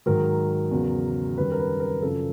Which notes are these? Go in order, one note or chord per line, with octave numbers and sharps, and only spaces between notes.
G#2 D#3 F#3 A#4
E2 C#3 F#3
F#2 D#3 G3 B4
A#4
B4
A#4
F#2 C#3 F3 A4